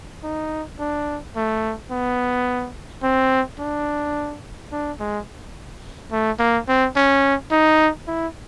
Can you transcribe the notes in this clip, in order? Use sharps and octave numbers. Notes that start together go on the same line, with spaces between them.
D#4
D4
A3
B3
C4
D4
D4
G#3
A3
A#3
C4
C#4
D#4
E4